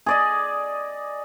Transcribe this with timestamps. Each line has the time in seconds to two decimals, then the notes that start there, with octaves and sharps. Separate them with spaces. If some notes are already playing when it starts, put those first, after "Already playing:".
0.06 G#4 D5 D#5